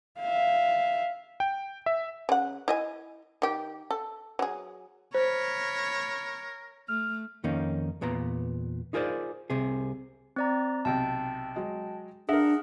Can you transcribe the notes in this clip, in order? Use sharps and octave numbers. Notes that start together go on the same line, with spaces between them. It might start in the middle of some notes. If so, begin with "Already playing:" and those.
E5 F5
G5
E5
C#3 F#5
E4 D#5 G#5
D#3 G4
A4
F#3 G#4
A#4 C5 C#5 B5
A3 F6
F2 D#3 A#3 C#4 D#4
E2 A#2 B3 A#5
D#4 F4 G#4 A#4 C5 D5
C2 C3 G#4
C4 D5 A#5
B1 C3 G5 A5
F#3 G#3
D4 G#4 A#4 E5 F#5